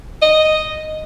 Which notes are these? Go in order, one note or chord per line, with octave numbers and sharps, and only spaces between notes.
D#5